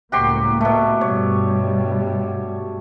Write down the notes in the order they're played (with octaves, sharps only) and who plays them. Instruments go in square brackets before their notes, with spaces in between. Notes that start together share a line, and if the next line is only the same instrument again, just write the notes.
[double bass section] C#2 A2 A#3 [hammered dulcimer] F#4 G4 C6
[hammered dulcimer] B2 A3
[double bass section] G2 B2 G3 [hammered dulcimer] C#5